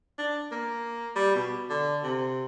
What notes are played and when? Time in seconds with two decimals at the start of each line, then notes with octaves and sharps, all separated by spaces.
0.18 D4
0.52 A#3
1.16 G3
1.35 B2
1.70 D3
2.03 C3